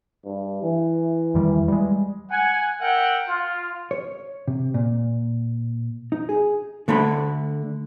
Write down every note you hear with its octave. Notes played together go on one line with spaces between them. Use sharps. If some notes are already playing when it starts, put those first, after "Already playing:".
G2
E3
E2 D#3 G3
G3 G#3
F#5 G#5
A#4 E5 F#5 G5
F4
C#5
C3
A#2
D#4
G#4
D3 A3 D4 B5